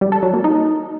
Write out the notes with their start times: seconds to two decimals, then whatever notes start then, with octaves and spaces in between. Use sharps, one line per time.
0.01 G3
0.12 A4
0.23 F#3
0.33 A#3
0.44 D#4